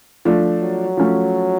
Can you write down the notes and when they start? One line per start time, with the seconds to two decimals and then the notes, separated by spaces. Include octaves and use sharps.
0.25 F3 A3 D4
0.62 F#3
0.97 F3 A3 C#4